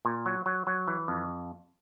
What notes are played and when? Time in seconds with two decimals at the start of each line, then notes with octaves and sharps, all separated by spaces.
0.05 A#2
0.26 F#3
0.46 F#3
0.67 F#3
0.88 E3
1.08 F2